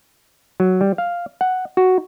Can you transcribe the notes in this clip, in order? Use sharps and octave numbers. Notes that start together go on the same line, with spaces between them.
F#3
G3
F5
F#5
F#4